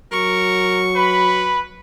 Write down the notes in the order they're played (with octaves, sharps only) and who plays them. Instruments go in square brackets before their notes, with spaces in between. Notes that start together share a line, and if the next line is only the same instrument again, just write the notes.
[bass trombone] F#3 [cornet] A#4 [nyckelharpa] C#6
[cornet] B4 [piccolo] B5